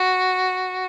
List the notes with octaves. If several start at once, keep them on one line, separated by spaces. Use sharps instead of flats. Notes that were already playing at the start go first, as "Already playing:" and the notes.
Already playing: F#4